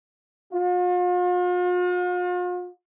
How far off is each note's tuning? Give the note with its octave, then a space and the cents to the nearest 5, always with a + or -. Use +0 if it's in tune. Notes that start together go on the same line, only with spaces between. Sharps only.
F4 +45